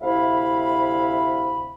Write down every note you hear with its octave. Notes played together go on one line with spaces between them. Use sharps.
D2 C3 E4 E5 F5 B5